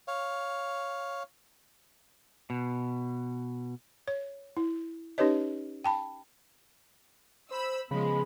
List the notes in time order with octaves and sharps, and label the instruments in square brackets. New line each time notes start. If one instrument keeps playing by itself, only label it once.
[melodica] C#5 F5
[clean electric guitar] B2
[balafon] C#5
E4
C#4 D#4 G4 B4 C#5 D#5
G5 A5 B5
[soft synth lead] C5 [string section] B5 E6
[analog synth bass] C#3 [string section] F3 G#3 [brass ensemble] B3 G#4 [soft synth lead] B5